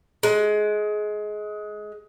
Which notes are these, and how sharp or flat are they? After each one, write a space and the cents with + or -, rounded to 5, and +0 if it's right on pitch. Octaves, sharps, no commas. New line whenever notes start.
G#3 +20